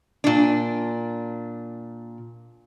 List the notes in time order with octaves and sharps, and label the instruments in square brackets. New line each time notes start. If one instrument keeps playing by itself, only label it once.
[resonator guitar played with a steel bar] A#2 D4